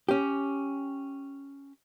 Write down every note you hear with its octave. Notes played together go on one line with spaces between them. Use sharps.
C#4 G4